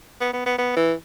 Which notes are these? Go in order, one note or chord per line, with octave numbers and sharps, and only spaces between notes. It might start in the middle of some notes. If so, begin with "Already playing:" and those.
B3
B3
B3
B3
E3